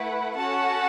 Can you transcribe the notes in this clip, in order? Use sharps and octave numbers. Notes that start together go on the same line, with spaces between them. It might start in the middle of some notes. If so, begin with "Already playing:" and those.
Already playing: A3 E4 B4 F#5
C#4 F#4 A4 F#5 A5